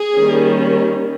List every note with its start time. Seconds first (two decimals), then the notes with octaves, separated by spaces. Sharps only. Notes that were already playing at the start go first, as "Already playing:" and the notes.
Already playing: G#4
0.17 D#3 G3 A#3 C#4